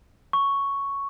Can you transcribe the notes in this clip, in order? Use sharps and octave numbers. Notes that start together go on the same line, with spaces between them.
C#6